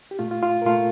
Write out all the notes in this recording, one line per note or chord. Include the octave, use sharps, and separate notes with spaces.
G4
A#2 A3 F4
F4
F4
A#4
A#2 A3 F4 A4